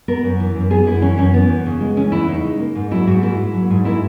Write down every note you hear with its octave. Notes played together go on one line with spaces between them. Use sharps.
B3 A#4
F#2
E3
F#2
B3 G#4
F#2 E4
E3 C#4
F#2 C#4
E3 B3
E2
C#3
G#3
E3 C#4
E2 E4
C#3 D#4
G#3
A#3
G#2
F#3 E4
G#2 F#4
A#3 E4
G#2
F#3
G#2
A#3 E4